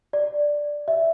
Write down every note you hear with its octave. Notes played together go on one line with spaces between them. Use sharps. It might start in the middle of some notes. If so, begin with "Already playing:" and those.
D5
E5